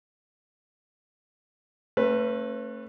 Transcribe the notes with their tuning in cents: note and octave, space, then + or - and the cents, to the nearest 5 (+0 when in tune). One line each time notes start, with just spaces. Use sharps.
A3 +25 C#4 -40 B4 +0